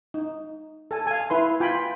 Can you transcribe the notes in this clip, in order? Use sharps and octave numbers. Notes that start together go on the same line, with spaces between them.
D#4
A4 G#5
F5 G#5
E4 B4 C6
F4 G5 G#5 B5